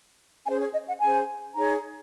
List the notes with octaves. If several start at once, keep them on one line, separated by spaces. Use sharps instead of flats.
C#4 G#4 C5 G#5
C#5
D#5
F#5
C#4 G#4 C5 G#5
D#4 G#4 C#5 A#5